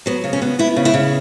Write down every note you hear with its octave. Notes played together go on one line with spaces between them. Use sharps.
F#3 B3
C#3
C#4
B3
B3 E4
C#3
E4
C#3